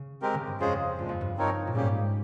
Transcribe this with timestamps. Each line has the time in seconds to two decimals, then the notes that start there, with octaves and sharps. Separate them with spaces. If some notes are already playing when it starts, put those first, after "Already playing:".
Already playing: C#3
0.22 G#3 C4 G4 A#4
0.35 C#3
0.47 G2
0.60 F2 G#3 C#4 F4 G#4 C5
0.98 G2 A#2 F3 G#3
1.09 F2
1.21 G2
1.37 F3 C4 D#4 A#4 C#5
1.67 A#2
1.74 G#2 C#3 G3 A#3 C#4 G4